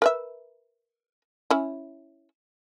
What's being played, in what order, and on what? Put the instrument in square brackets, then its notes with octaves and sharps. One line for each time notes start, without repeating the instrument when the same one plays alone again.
[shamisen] A#4 B4 E5
C#4 E4